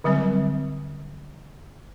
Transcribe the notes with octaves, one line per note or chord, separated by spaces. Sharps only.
D3 F#3 G3 C4